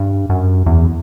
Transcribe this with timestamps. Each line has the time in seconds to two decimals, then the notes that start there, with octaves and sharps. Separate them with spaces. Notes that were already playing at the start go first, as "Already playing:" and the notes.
Already playing: G2
0.29 F#2
0.66 E2